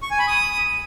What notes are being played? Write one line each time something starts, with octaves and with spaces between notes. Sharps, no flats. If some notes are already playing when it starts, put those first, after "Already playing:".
C#6
G#5
B5
D#6